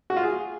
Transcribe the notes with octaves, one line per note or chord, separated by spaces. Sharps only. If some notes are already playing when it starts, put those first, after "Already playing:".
F#4
F4
G#4